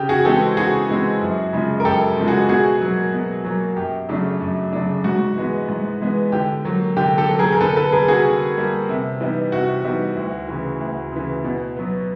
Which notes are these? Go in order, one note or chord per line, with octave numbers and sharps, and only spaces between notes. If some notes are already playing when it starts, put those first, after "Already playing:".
Already playing: C#3 G4
F#4 G#4
E3 G#3 C4 G4 A4
C#3 F#4 G#4
E3 G#3 C4
F#2
C#3 F3 G#3
A#4
F#2 G4 A4
C#3 F3 G#3
F#4 G#4
B2 F#4 G#4
F#3 A#3
B2
F#3 A#3
F#2 G4
C#3 F#3 A3 D4
F#2
C#3 F#3 A3 D4
G#2 F#4
E3 G#3 B3
G#2
E3 G#3 B3
D3 G4
F#3 A#3
D3 G4
G4 A4
F#3 A#3
G#4 A#4
A#4
D3 A4 B4
A4 B4
G3 A#3 G#4 A#4
F#4 G#4
D3
G3 A#3
C3
E3 G3 B3 D#4
C3 F#4
E3 G3 B3 D#4
D2
C#3 E3
D2
C#3 E3
B2
F#3 B3